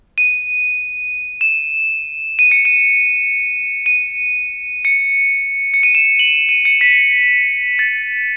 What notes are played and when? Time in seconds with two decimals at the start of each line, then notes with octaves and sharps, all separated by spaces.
0.18 D#7
1.41 E7
2.39 D#7
2.52 C#7
2.65 D#7
3.86 D#7
4.85 C#7
5.74 C#7
5.83 D#7
5.95 E7
6.19 F#7
6.49 D#7
6.65 C#7
6.81 B6
7.79 A6